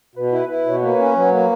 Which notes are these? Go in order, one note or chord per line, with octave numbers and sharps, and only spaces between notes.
B2 B4
E4
E4
B2 C#5
A#3 B4
C#4
F#3
A#3